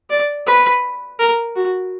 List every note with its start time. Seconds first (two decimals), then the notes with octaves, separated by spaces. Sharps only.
0.10 D5
0.46 B4
1.19 A#4
1.56 F#4